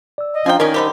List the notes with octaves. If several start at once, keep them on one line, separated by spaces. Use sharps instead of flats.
D5 E6
D#5
F3 C#4 D4 G5 G#5 A#5
D#3 C#4 D#4 A#4 D5 G#5
D3 G3 G4 A#4 C5 D#5